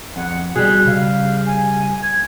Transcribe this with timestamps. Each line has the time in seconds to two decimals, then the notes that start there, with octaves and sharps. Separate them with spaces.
0.16 F2 F#5
0.56 B2 G3 G#4 F#6
0.86 C#3 F5
1.46 G#5
2.02 G#6